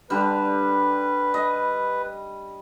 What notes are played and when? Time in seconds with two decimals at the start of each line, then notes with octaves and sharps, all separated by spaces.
0.10 D3 G3 B4
1.34 D#5